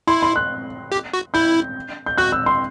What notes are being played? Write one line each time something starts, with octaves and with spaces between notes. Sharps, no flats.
E4 C6
C6
F#6
G4
F#4
E4 G6
G6
F#4 F#6
E6
C6